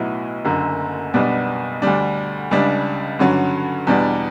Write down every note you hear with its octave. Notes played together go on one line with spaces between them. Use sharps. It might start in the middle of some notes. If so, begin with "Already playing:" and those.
Already playing: B1 A2 F#3 B3 E4
F#1 F#2 D3
B1 B2 G3 B3 D4
D2 D3 G3 D4
C#2 C#3 G3 D4
G2 D3 F#3 C#4
E2 B2 G3 D4